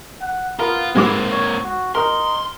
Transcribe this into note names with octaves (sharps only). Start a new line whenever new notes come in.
F#5
B3 F4 A#4
G#2 G#3 A#3 C4 D6
C#5
F#4
D#4 A#4 C6